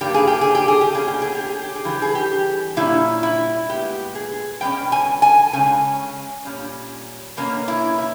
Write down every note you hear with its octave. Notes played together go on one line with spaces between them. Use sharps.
G2 G3 A#3 G4
G#4
G4
G#4
G4
G#4
G4
B2 A#3 C#4 G#4
G4
G#4
G4
G#4
G4
G#4
C#3 E3 G3 G4
G#4
G4
A#2 G3 C#4 E4
E4
A#2 G#3 B3 G4
G#4
B2 G3 C#4 G5
G#5
G#5
C#3 G#3 C#4 G#5
A#2 G3 C#4
B2 A#3 C#4
E4
E4